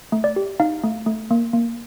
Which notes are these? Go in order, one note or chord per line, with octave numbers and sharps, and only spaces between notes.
A3
D5
G4
D#4 F5
A3
A3
A#3
A#3